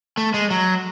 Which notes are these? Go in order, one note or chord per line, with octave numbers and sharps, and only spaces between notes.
A3
G#3
F#3